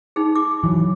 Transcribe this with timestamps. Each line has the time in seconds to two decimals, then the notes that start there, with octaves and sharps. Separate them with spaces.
0.16 D#4 G#4
0.35 D6
0.64 E3 F#3